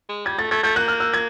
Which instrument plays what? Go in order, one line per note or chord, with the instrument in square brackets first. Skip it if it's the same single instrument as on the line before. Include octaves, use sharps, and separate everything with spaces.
[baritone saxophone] G#3
[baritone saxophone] G3 [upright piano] G#6
[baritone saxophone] A3 [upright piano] A6
[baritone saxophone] A3 [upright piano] G#6
[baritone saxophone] A3 [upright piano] G6
[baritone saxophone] A#3 [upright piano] F#6
[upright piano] F6
E6
G#6